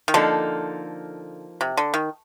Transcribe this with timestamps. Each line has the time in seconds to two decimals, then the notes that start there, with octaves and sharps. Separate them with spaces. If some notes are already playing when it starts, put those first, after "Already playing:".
0.08 D#3
0.14 D3 F3 A#3 D#4 A4
1.61 C3
1.77 D3
1.94 D#3